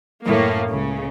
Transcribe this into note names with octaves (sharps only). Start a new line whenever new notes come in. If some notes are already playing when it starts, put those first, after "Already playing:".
F#2 A2 A#3
C#2 C#3